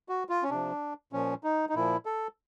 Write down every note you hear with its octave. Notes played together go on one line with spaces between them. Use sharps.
F#4
F4
C#4
C3 F3 D4
A#2 F3 C#4
D#4
D#4
A#2 F3 E4
A4